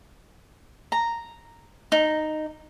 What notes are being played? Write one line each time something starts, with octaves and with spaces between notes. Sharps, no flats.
A#5
D#4